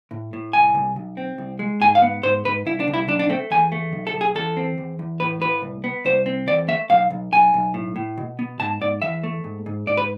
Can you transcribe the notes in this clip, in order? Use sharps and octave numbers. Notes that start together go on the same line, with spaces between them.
A2
A2
C2 G#5
C2
B1
C4
C2
G#3
G#2 G#5
F5
B3
G#2 C5
G#2 B4
C2 E4
D4
C2
E4
B1 D4
D4
A3 C4
E2 G#5
A3
B1
A4
B1
G#4
E2 A4
C4
E2
E2
A2 B4
A2 B4
C2
B3
C2 C5
C4
E2 D5
A3 E5
B1 F5
B1
B1 G#5
B1
A2
A2
B2
B3
G#2 A5
G#2 D5
E2 E5
A3
G#2
G#2
G#2 D5
B4